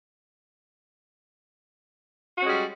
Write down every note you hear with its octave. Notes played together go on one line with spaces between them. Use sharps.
G3 G#3 C#4 F#4